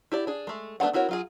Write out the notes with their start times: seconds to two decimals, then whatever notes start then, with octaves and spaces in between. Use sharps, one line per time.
0.12 E4 G4 D5
0.27 D4 G#4
0.47 G#3 A3
0.80 A3 B3 D4 F4 F#5
0.93 C4 E4 F#4 A#4 C#5
1.09 F#3 F4 G#4